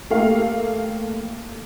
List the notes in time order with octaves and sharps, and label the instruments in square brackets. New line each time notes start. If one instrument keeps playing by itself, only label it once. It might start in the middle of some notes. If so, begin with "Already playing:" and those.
[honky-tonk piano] A3 A#3 G4 F5